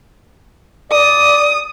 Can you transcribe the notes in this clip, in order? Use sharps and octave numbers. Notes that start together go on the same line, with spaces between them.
D5 D#6